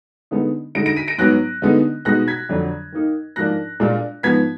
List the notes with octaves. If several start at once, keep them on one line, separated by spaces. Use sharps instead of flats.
D3 G#3 B3 D#4
D3 G#3 D#4 A#6 D7
A#6 D7
B6 D#7
A#6 D7
G#2 F#3 B3 F#6 A#6
D3 G#3 B3 D#4
B2 G#3 D#4 F#6 A#6
G#6 B6
F2 D3 F#3 D4
D#3 A#3 D#4
G#2 F3 A#3 D4 F#6 A#6
A#2 G#3 D4 F4
G#2 F3 B3 G#6 B6